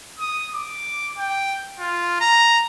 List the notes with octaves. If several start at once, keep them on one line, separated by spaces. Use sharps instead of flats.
D#6
D6
G5
F4
A#5